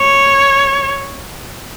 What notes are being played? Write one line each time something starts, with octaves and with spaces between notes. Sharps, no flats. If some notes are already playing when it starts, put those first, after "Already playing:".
Already playing: C#5